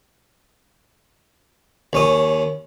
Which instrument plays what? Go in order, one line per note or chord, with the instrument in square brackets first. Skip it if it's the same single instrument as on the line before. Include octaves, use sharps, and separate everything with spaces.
[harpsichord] D#2 C#4 D#6